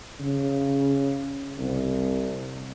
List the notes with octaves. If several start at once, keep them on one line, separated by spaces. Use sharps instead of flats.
C#3
C2